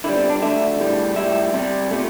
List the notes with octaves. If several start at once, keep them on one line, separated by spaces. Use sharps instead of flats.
D3 G3 E4
C4
D4
D3 A3 E5
A2 G3
A2 G3 E5
C3 G3
C3 A3